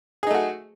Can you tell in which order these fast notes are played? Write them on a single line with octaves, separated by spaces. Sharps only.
G#4 D#4 A3 F#4